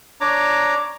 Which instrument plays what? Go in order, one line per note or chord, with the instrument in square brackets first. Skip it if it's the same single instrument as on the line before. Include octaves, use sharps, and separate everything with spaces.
[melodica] D4 C#5 A#5 D6